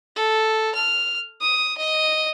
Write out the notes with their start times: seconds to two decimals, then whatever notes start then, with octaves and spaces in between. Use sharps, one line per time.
0.16 A4
0.75 F6
1.41 D#6
1.77 D#5